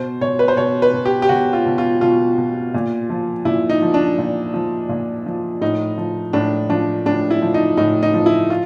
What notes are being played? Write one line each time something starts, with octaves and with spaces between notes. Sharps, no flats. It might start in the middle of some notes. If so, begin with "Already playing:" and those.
Already playing: B2 C5
B2 C#5
B4
C5
B2 C#5
B4
B2
G4
G4
B2 F#4
F4
B2
F4
B2 F4
B2
A#2
F3
A#2 E4
D#4
F3
D4
A#2
F3
A#2
F3
A2 D#4
F3
A2 D4
F3 D4
A2 D4
E4
F3
D#4
A2 D#4
D#4
F3
E4
F4